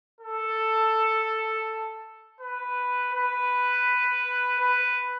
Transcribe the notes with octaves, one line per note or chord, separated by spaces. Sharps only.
A4
B4
B4
B4